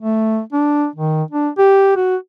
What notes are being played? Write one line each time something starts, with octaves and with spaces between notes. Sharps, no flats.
A3
D4
D#3
D4
G4
F#4